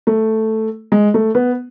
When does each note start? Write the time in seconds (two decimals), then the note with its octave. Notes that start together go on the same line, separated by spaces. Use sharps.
0.07 A3
0.92 G#3
1.14 A3
1.35 B3